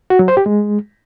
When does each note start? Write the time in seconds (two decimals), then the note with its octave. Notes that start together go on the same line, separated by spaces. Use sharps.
0.10 F#4
0.19 F#3
0.28 C5
0.37 G4
0.46 G#3